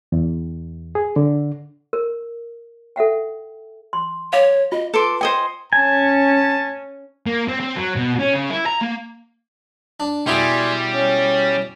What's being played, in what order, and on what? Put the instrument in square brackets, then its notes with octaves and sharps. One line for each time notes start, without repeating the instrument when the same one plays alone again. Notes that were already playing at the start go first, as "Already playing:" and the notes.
[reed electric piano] E2
G#4
D3
[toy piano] A#4
A4 E5 F#5 G5
C6
[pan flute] C#5 [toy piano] F5 D6
[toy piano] F4 [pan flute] D#5
[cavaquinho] A4 C6 D6 [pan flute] B4
[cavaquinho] C5 D#5 G#5 [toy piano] G5
[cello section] C#4 [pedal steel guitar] G#5 [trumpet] A5
[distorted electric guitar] A#3
C4
C4
F#3
B2
C#4
C#3
E4
A#5
A#3
[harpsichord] D4
[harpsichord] B2 E4 G#4 [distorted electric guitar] G3 [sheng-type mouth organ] D5 G#5 C6
[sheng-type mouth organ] C#4